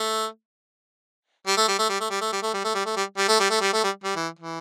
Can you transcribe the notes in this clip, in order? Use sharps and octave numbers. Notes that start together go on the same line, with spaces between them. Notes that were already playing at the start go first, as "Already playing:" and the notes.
Already playing: A3
G3
A3
G3
A3
G3
A3
G3
A3
G3
A3
G3
A3
G3
A3
G3
G3
A3
G3
A3
G3
A3
G3
G3
E3
E3